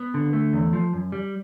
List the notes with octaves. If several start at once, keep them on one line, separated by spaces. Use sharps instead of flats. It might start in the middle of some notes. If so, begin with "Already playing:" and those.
Already playing: B3
D3
A3
E2
F3
F#2
G3